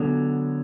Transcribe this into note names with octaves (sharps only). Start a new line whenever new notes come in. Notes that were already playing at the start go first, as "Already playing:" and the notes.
Already playing: D3 F#3 B3